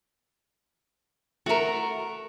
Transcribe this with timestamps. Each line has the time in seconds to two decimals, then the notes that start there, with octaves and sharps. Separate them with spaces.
1.46 A3 F#4 A#4 E5